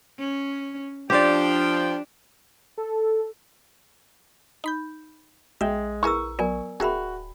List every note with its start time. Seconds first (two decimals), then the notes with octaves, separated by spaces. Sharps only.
0.19 C#4
1.10 F3 D4 G4 C5 D5 G5
2.78 A4
4.64 D#4 B5 G6
5.61 A#1 G#3 E5 G5
6.03 E4 G#4 A#4 B4 A#5 C#6 E6
6.39 F#3 B3 A#4 D5 G#5
6.80 D1 F#4 G#4 A#4 E5 G5 B5